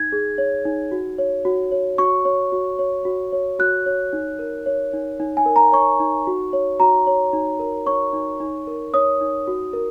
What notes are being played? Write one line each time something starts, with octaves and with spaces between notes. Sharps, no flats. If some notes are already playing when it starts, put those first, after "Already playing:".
Already playing: D#4 G#6
G#4
C#5
D#4
F#4
C#5
F#4
C#5
F#4 C#6
C#5
F#4
C#5
F#4
C#5
F#4 F#6
C#5
D#4
A#4
C#5
D#4
D#4
G#5
A#4
A#5
C#5 C#6
D#4
F#4
C#5
F#4 A#5
C#5
D#4
A#4
C#5 C#6
D#4
D#4
A#4
C#5 D#6
D#4
F#4
A#4